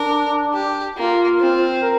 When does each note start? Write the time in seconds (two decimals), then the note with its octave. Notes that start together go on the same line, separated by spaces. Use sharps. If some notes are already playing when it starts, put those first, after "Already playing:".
Already playing: D4 A#4
0.54 G4
0.97 A#3 F4
1.40 C4
1.82 A#4